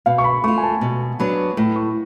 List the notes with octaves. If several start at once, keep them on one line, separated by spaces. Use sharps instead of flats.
B2 F5
C#6
B5
A3 F4 C#6
G#5
A5
B2
F#3 B3 D4 B5
A2 B5
C#6